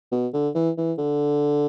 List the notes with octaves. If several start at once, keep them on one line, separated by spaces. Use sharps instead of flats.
B2
D3
E3
E3
D3